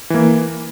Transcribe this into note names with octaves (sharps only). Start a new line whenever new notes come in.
E3 A#3